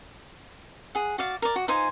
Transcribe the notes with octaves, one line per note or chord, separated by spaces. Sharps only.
G#4 F#5
F#4 D5 F5
A#4 D5
F#4
D#4 F4 C5 G#5